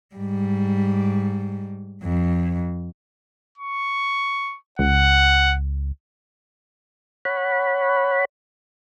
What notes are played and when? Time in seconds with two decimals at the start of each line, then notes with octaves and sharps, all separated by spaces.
0.16 G#2 G3
2.03 F2
3.58 C#6
4.79 C#2 F#5
7.25 C#5 F#5 B5